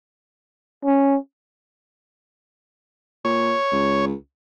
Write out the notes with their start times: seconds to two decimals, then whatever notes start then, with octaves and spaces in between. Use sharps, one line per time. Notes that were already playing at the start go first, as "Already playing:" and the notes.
0.85 C#4
3.25 A#2 C#5
3.72 C#2